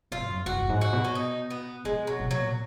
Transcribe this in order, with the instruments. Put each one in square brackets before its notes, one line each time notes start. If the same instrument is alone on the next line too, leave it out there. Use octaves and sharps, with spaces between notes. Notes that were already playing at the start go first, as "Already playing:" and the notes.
[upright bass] G#2 [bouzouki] F4
[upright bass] F#2
[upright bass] F#2 [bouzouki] F#4
[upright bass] F#2
G#2
[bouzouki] F#4
[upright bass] B2
[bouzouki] C#4
D#4
B3
[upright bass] C#3 [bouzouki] G#3
[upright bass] B2 [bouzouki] F#3
[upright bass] B2
[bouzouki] F#3
[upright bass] A#2